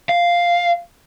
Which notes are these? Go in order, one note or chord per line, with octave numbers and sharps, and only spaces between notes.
F5